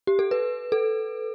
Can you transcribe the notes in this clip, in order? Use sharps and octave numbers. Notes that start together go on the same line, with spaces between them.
G4
A4
B4
A4